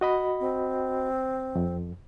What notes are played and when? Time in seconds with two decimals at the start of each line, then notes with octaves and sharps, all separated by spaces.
0.01 F#4 D#5 B5
0.40 C4
1.55 F2